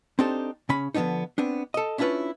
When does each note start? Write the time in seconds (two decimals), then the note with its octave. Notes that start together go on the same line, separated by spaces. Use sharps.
0.19 C4 D4 D#4 G4 A4 C5
0.69 C#3 C#4 B5
0.94 D3 F3 F#3 B3 D4 D#4
1.38 B3 C4 D4
1.74 A4 D#5
1.98 C#4 D4 E4 F4 B4 C#5